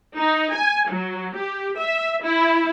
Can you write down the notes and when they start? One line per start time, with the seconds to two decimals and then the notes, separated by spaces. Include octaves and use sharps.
0.16 D#4
0.54 G#5
0.90 F#3
1.36 G4
1.78 E5
2.22 E4